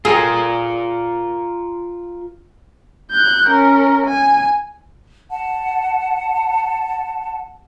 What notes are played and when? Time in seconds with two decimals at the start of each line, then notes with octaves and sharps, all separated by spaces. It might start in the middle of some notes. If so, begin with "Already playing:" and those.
0.05 F4 G#4 A#4
3.12 F#6 G6
3.49 C#4 A#4
4.06 G#5
5.30 F#5 A5